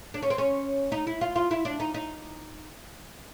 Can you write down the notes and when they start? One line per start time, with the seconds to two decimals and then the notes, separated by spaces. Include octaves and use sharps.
0.14 D4
0.22 C#4
0.30 C4
0.38 C#4
0.92 D#4
1.07 E4
1.21 F4
1.36 F4
1.51 E4
1.65 D4
1.80 D#4
1.94 D#4